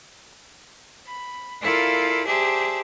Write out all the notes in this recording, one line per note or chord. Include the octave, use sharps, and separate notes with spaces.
B5
E4 F4 A4 A#4 D5 F5
G4 G#4 C5 D5 E5 A5